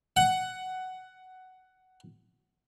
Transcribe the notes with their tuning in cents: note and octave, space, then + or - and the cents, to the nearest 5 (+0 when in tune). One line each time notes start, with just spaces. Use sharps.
F#5 +10